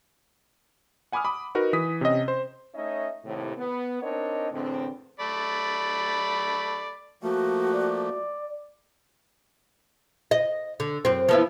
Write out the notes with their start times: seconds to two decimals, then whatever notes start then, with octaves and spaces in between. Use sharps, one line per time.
1.12 F#5 G#5 B5 D6 D#6 F6
1.25 B5 D6 D#6
1.55 D#4 F#4 A#4 B4
1.73 E3 D#6 B6
2.01 C3 C#4 D#5
2.28 C5
2.75 A3 C#4 D#4 C#5 D#5 E5
3.24 D#2 A2 C3
3.57 B3
4.03 C4 D4 D#4 A#4 C#5 D#5
4.51 E2 A2 D3 C4
5.20 A3 D5 B5
7.23 F3 A3 A#3 F#4
7.74 D5
10.31 D#5
10.80 D3
11.05 F#2 C4
11.29 F3 B3 E4